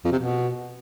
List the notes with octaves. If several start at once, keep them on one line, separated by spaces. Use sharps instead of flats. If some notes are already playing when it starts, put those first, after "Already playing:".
F2
C3
B2